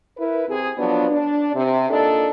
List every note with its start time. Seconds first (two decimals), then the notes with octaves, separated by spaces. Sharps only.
0.17 E4 A#4 B4
0.49 C3 G#4
0.78 F3 F#3 B3 D4
1.10 D4
1.54 C3
1.90 A#2 D4 D#4 A4